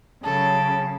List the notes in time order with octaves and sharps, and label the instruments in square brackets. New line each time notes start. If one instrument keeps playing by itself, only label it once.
[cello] C#3 F#3 [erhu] A4